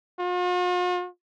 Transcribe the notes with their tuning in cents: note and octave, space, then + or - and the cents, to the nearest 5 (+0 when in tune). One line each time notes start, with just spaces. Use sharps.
F4 +45